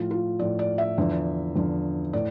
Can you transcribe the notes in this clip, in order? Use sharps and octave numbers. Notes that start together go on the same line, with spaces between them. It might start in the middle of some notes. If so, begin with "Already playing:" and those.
Already playing: A2 F3 F4
F4
A2 F3 D5
D5
E5
E2 D3 F3
E2 D3 F3
A2 D5